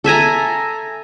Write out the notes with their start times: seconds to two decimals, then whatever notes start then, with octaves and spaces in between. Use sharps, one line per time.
0.04 A4 E5 G#5 A#5